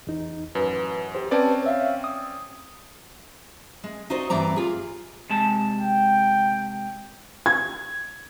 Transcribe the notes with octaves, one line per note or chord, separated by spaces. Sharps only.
E2 D#4
A1 F#2 B4
G4 C5
C4 C#4 B4 D5 A5
C#5 E5 F5
D#6
G#3
D#4 F#4 C5 D5 D#5
G2 E3 C4 D5 A#5
F4 G#4
C3 G#3 A5
G5
G#6